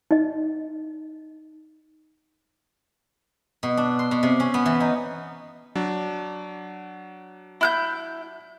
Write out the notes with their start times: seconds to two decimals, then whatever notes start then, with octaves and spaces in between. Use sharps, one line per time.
0.11 D#4 D#5
3.63 B2
3.77 D4
3.99 C6
4.11 B2
4.23 C3
4.40 C#4
4.54 B3
4.66 E3
4.80 D#4
5.75 F#3 D4
7.61 E4 F#6 G6